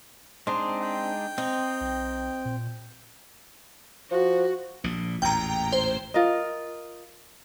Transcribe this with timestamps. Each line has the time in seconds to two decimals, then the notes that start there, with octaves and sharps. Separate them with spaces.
0.47 G#3 C4 D4 D#4
0.82 G5
1.38 C4 D#4
1.81 B1
2.45 A#2
4.11 F3 F#4
4.84 A#1 A#2
5.22 A1 E2 A#2 G5 A#5
5.72 C5
6.14 F4 A#4 D#5